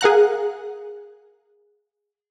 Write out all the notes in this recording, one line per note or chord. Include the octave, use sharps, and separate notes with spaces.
G#4 A#4 F5 F#5 A#5 F#6